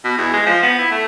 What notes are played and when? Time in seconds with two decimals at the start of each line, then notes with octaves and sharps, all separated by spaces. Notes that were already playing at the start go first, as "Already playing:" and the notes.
0.04 B2
0.18 E2
0.33 G#3
0.46 F3
0.62 B3
0.79 E4
0.91 A3